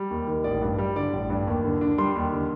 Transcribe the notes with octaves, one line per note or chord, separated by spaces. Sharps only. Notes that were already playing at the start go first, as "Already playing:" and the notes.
Already playing: G3
D#2
D#3
A1 D5
G2
G3
D3 D5
A1
G2
D#2
D3
D4
G3 C6
D#2
D3